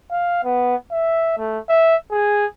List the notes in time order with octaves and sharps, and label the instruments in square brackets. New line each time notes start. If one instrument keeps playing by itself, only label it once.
[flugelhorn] F5
B3
E5
A3
E5
G#4